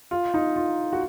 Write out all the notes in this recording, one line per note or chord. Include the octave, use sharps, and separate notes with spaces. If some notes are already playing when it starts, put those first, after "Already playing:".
F4
D#4
F4
F#4